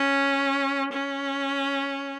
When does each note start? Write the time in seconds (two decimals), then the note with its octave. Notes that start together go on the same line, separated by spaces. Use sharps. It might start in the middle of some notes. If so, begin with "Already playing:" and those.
Already playing: C#4
0.92 C#4